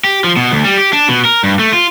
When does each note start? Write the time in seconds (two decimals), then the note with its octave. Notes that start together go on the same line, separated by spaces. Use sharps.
0.04 G4
0.24 F3
0.37 B2
0.52 D2
0.65 G3
0.78 G4
0.93 D4
1.08 B2
1.25 A#4
1.44 G2
1.59 A3
1.73 F4